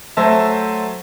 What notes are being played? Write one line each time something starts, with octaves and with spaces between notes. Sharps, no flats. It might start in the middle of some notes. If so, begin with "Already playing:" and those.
F#3 A3 C5 E5 A5